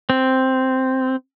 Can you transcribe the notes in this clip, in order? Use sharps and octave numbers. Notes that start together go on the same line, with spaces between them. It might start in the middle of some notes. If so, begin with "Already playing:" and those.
C4